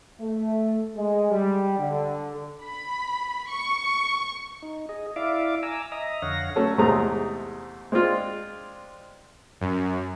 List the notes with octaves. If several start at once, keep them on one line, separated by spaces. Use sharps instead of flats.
A3
G#3
G3
D3
B5
C#6
D#4
G#4 D#5
E4 D5 E5 F5 D6
G#5 A#5 D6 E6
D#5 E5 A#5 D#6
F2 D3 C#5 F5 F#5 A#6
F#3 A3 C#4 A4
E2 G#2 C3 A3 A#5 D#6
G#3 C4 D4 F4
F#2